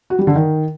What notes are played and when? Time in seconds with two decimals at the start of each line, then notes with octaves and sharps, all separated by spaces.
0.10 F#4
0.19 G3
0.27 D3
0.36 D#3